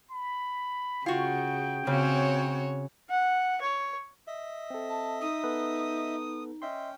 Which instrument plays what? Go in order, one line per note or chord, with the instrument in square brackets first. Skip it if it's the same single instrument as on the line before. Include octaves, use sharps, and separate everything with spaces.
[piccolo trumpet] B5
[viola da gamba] C#3 [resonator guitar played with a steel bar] F4 F#4 [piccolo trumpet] G5
[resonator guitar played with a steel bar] A#2 [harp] C#3 [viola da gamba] C4 F#4 C#5
[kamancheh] F#5
C#5
[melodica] D#5 E5
[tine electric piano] C4 A4
[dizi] A5
[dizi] D#4 [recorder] D#6
[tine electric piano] B3 A4 B4
[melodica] C#4 G5 [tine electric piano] D#5 E5 C6